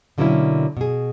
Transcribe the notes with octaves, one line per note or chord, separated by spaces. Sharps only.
B2 D3 F#3 A#3 C#4 E4
B2 G#4